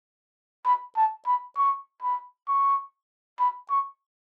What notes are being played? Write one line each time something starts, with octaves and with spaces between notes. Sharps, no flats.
B5
A5
B5
C#6
B5
C#6
B5
C#6